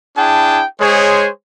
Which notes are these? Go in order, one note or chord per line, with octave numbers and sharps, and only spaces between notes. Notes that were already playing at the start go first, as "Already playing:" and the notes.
D4 E4 G#4 G5 A5
G#3 G#4 C5 C#5